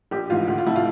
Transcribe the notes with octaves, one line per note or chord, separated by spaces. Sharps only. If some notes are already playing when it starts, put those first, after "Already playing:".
A#1 G4
G#2 E3 F4
D2
F4
C3 F3 E4
F4